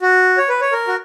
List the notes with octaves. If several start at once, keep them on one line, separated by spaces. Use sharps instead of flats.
F#4
C#5
B4
C#5
A#4
F#4